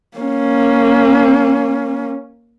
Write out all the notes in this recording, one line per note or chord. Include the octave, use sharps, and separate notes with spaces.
A#3 C#4